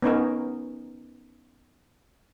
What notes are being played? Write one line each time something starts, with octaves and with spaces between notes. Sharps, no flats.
B3 C#4 D#4 A#4